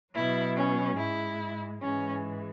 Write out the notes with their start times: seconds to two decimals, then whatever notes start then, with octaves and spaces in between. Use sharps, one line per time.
0.14 B2 F#3 E4
0.56 C#4
0.98 G#2 G#3 E4
1.82 G#2 E3 G#3 C#4